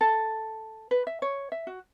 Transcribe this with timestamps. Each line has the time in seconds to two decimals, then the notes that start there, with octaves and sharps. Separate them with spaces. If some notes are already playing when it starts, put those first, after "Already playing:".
0.01 A4
0.91 B4
1.07 E5
1.22 C#5
1.52 E5
1.67 F#4